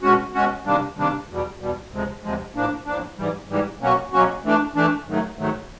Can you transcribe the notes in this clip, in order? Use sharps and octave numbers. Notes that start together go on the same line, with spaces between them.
B2 G#3 C#4 F#4
B2 G#3 C#4 F#4
C3 D#3 G3 A#3 D4
C3 D#3 G3 A#3 D4
E2 B2 G3
E2 B2 G3
D2 C3 F3 G#3
D2 C3 F3 G#3
A2 F3 A#3 D4
A2 F3 A#3 D4
G#2 E3 G3
G#2 E3 G3
B2 F#3 A#3 C#4 F#4
B2 F#3 A#3 C#4 F#4
E3 A3 D4
E3 A3 D4
G#2 D#3 F#3 A3
G#2 D#3 F#3 A3